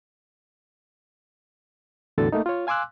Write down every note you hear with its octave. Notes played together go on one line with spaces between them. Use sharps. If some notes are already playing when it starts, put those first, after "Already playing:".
E2 A2 D3 F#4 A4 A6
A3 A#3 D#4
F4 C#5
F5 G#5 C6 D6 E6 F#6